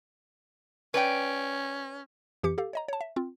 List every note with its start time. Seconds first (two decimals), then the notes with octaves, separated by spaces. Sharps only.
0.94 C#4 B4 D5 G5
2.43 F2 E3 G4 D6 C#7
2.58 G4 A4 F5
2.73 C#5 D#5 A#5
2.88 C#5 A5
3.01 E5
3.16 C4 F4